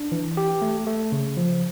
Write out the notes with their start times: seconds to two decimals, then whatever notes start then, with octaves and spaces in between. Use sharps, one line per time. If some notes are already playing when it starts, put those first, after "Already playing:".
Already playing: D4
0.12 E3
0.37 G4
0.62 A3
0.87 A3
1.12 C#3
1.37 F3